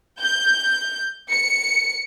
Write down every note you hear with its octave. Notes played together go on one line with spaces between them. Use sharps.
G6
C#7